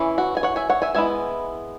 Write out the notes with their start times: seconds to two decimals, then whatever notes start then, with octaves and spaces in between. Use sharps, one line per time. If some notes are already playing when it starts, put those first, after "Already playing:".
Already playing: E3 C#4 E4
0.18 F#4
0.37 G#5
0.43 C#5 F#5
0.56 E5 G#5
0.70 C#5 F#5
0.82 E5 G#5
0.95 G#3 B3 E4 E5 G#5